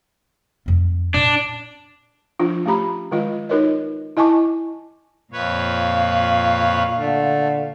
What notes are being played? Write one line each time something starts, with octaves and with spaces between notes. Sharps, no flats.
F2 A3
A#2 D4
F3 D4 F4
A3 C#4 G4 A#5 B5
D#3 G#3 F4 D#5
D#4 F#4 A#4 B4 C#5 D#5
E4 D#5 G#5 A5 C#6 D6
F2 A#2 B4 C#5 F5
D3 A3